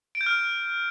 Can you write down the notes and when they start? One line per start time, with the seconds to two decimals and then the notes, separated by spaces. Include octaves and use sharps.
0.15 D7
0.21 G6
0.26 F6